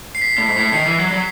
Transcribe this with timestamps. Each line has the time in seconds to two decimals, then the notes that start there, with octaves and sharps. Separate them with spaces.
0.15 C7
0.22 B6
0.38 A2
0.47 G#2 B6
0.56 A2
0.73 D#3 C7
0.86 E3
0.99 F#3
1.11 F#3